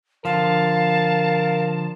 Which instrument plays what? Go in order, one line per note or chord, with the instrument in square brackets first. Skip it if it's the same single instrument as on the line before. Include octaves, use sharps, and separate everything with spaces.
[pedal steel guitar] D3 F3 [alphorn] A#4 [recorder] F5 [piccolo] A5